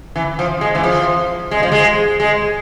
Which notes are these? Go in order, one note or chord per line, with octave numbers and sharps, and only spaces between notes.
E3
F3
G#3
E3
F3
G#3
F3
G#3
G#3